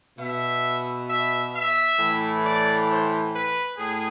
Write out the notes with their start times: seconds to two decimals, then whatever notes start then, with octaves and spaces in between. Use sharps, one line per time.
0.18 B2 E5
1.08 E5
1.53 E5
1.97 A2 E3
2.43 D5
2.89 C5
3.33 B4
3.77 A2 G#4